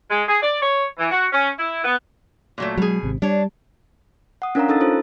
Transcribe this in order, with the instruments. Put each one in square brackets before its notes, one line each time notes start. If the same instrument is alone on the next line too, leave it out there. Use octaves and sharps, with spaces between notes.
[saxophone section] G#3
G#4
D5
C#5
E3
F#4
C#4
E4
B3
[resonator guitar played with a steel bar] A#2 F#3 A3
[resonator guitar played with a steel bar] B2 G#4 [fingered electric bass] F#3 G#3
[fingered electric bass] G#1 C3
[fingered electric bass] G3 [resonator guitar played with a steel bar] D4 C#5
[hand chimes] F#5 D#6
C#4 D4 A#4 C#5 F5 A#5
C#4 D#4 A4 D#6 E6 A6
F4 A4 C5